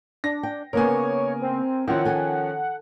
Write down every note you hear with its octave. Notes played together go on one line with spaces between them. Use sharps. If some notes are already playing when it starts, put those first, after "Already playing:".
D4 A#6
G5
C#3 A#3 B3 A#4 C#5 G#5
C4
D#3 F3 C4 C#4 E4 F#5
A4 G#5